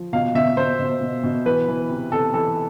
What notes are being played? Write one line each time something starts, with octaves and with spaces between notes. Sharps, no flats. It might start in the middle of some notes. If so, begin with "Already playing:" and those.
Already playing: F3
B2 F5
B2 E5
B2 C5
B2
B2
B2
E3 B4
E3
C3
C3 A4
E3 A4